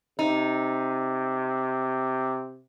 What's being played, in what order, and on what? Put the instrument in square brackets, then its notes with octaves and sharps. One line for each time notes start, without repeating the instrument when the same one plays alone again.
[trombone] C3 [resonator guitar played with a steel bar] D#4